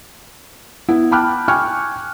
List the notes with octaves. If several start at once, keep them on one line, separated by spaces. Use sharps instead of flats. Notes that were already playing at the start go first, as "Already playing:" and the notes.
B3 E4
G5 A5 B5 D6 F6 F#6
G5 G#5 C#6 F6 F#6